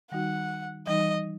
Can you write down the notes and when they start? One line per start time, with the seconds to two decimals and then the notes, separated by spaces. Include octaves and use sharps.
0.11 D#3 G3 D#4 F#4 F#5
0.86 E3 G3 D#4 D#5